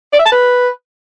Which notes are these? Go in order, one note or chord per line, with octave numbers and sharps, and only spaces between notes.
D5
E5
A5
B4